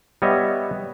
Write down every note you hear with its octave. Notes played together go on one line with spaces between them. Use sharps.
G3 B3 C#5 D#5 E5